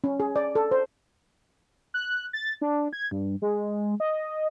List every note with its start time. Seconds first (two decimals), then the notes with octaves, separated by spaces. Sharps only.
0.04 C#4
0.20 G#4
0.36 D5
0.55 A4
0.71 C5
1.94 F#6
2.33 A6
2.62 D4
2.93 G#6
3.11 G2
3.42 G#3
4.00 D#5